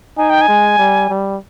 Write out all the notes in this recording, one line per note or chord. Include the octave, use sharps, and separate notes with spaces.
D#4 G#5
G5
G#5
G#3
G3
G3